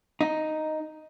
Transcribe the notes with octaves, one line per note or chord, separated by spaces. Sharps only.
D#4